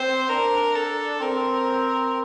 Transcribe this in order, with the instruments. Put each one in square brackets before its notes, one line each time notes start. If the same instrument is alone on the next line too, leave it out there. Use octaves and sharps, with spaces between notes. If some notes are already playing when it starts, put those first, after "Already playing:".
Already playing: [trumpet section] C4 [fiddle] C5
[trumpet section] D4 [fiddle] A#4
[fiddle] A4
[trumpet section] C4 [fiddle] A#4